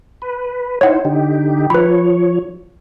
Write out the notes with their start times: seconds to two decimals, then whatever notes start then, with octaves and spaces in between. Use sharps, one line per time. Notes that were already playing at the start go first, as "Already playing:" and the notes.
0.22 B4
0.81 D#4 E4 C5 C#5 F#5
1.05 D3 D#4 G4
1.70 F3 B4 C#5 B5